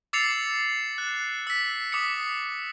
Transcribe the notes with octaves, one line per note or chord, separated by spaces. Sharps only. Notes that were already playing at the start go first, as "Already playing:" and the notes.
D6 E6 A6 C7 C#7 F7
F#6
E6 B6
D6 D#6 B6 C#7